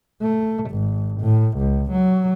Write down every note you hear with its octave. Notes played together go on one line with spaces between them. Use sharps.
A3
G#1
A2
C#2
F#3